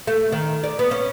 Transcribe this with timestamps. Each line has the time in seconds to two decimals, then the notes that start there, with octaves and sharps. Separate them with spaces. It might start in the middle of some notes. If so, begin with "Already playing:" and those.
0.07 A3
0.32 D#3
0.64 D5
0.79 B3
0.91 C#4